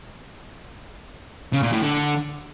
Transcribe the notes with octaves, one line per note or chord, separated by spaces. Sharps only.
C#3
A#2
A2
D3